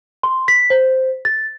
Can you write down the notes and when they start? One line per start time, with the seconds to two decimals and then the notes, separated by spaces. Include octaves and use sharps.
0.23 C6
0.48 B6
0.70 C5
1.25 A6